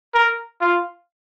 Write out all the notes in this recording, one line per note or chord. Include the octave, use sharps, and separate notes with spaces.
A#4
F4